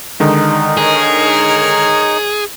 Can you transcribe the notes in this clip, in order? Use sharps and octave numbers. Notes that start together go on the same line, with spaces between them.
D3 D#3 G#3 D#4
G#4 A#4 C#5